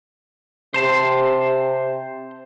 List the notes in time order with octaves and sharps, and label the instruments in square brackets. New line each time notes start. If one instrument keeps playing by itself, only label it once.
[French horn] C3 [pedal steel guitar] C5 A5 C6